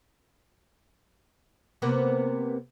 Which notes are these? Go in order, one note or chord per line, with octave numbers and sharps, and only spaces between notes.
C3 A#3 B3